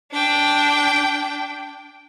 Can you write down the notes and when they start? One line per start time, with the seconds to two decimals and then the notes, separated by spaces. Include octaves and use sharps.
0.12 D4 G5